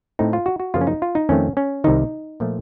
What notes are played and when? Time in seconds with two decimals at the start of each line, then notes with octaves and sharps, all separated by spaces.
0.19 A2 A3 C4 D#4
0.33 F4
0.46 F#4
0.60 F#4
0.74 F#2 C#3 F3 A#3 F4
0.81 C#4
0.87 D#4
1.02 F4
1.15 D#4
1.29 F2 D#3 A3 C4 C#4
1.57 C#4
1.84 C2 C3 D#3 D#4
2.40 A#2 F3 A3